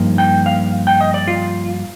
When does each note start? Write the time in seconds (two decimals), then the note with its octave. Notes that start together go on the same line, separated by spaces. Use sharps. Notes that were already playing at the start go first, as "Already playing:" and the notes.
Already playing: G2 F3 A#3 D#4
0.18 G5
0.46 F5
0.87 G5
1.01 D#5
1.14 D5
1.28 F4